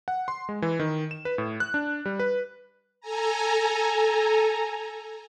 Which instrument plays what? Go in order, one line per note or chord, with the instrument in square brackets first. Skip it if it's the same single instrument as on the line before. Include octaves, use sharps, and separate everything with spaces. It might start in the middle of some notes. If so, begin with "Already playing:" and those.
[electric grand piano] F#5
C6
G#3
E3
D#3
E7
B4
A2
F#6
D4
G3
B4
[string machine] A4 G#5 A#5